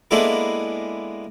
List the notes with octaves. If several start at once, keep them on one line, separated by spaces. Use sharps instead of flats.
G#3 A#3 B3 D4 E4 A4